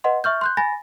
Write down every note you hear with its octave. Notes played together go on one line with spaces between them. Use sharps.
B4 D#5 F#5 C6
E5 C#6 F6 G6
C6 F#6 G6
G#5 B5 A6 A#6